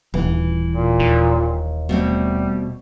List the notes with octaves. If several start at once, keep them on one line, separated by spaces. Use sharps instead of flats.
D#1 E3
A#2
D#2
B2 G3 A3 C4